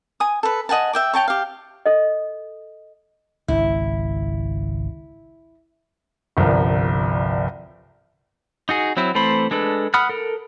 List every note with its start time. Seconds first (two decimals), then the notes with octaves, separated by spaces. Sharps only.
0.20 G#5 D#6
0.43 A4 B4
0.69 D#5 F#5 G#5 A5
0.93 E5 G5 D6
1.13 C#5 G5 A5 C#6
1.28 G4 F5
1.86 A4 D#5
3.48 G#1 C#2 E4
6.37 G1 C2 F3 A#4
8.69 D#4 F#4 G#4
8.97 F#3 C4 E4
9.15 E3 A3 C4 C5 B5
9.51 G#3 D4 A4 B4
9.94 F#5 B5 D#6 F6 F#6
10.09 A4 A#4